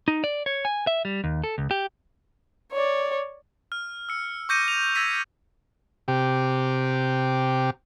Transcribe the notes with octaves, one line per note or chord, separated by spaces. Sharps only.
D#4
D5
C#5
G#5
E5
G3
D#2
A4
C#2
G4
C#5 D5
F6
E6 C#7
C#6 D6 G6 A#6 C#7 D#7
F7
E6 G#6 A#6 B6 D#7
C3 G4